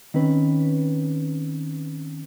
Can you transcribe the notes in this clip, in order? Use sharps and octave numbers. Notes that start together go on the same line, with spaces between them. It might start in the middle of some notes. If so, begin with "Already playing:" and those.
D#3 C4 C#4 B4